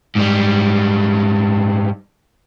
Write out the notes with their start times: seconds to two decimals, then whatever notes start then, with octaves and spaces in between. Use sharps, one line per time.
0.16 G#2 G3